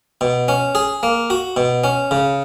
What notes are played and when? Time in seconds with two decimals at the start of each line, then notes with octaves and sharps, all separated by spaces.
0.21 B2
0.48 C#4
0.75 G#4
1.03 A#3
1.30 F#4
1.57 B2
1.84 C#4
2.11 C#3